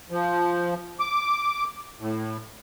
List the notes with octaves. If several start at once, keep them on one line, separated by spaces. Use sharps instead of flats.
F3
D6
A2